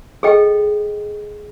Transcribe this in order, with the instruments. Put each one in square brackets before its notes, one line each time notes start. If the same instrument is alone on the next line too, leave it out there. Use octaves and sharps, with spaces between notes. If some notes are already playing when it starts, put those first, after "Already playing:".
[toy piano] G#4 A4 D#5 G5